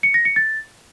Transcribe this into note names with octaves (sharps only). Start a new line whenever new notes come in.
C#7
A#6
C#7
A6